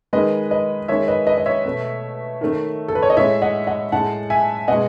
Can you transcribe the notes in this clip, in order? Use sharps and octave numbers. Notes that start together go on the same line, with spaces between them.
D#3 G#3 B4 D#5
B4 D#5
D#3 G#3 C#5 E5
B4 D#5
B4 D#5
D#5
C#5 E5
B2 A3
D#3 A3
A4
B4
C#5
D#5
A2 G#3 C#5 E5
D#5 F#5
D#5 F#5
A2 G#3 F#5 A5
E5 G#5
B2 G#3 D#5 F#5